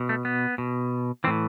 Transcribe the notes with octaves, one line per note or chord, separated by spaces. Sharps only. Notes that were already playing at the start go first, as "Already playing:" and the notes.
Already playing: B2
A3
B3
B2
A2 E3 C4